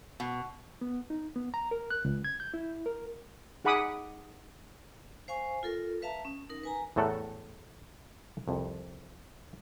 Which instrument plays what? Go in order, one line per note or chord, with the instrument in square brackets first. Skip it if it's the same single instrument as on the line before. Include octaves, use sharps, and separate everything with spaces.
[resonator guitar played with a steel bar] B2
[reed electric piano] B3
D#4
B3
A#5
A#4
F#6
C#2
G#6
G6
E4
A#4
[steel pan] D#4 G#4 F#5 B5 D6 D#6
[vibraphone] C5 F5 G#5 C#6
F4 A4 A#4
B4 E5 F5 A5 A#5
C#4
D#4 A#4
B4 G#5 A#5
[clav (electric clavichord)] E2 A2 A3 A4 A#4 F#5
C2 F2